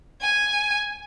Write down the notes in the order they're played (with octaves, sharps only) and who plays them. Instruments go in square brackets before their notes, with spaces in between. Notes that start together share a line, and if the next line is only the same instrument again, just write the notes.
[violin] G#5